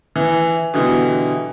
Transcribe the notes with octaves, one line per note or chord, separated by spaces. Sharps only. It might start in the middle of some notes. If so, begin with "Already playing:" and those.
E3
B2 D3 E3 G3